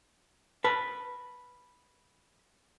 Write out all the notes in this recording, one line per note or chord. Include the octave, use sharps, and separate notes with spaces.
B4 A5